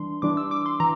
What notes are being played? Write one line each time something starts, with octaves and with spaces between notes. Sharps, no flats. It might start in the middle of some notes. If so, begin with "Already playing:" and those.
Already playing: E3 G3 D4 C6
E3 G3 D4 D6
E6
D6
C6
E3 A#5